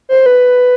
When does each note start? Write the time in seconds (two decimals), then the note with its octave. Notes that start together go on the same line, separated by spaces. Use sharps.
0.09 C5
0.26 B4